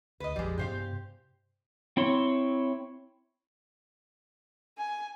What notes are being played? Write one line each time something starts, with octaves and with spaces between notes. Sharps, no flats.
D2 B4 D#5
F1 A#1 F3 G3 G#3
G2 C3 B3 G4 C5 F5
C4 E4 C#5 C6
G#5